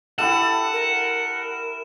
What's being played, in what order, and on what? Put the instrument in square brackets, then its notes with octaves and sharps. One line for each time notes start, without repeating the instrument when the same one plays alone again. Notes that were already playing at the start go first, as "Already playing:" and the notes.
[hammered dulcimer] E4 G4 A4 [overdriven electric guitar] F#5 [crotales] E7
[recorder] A#4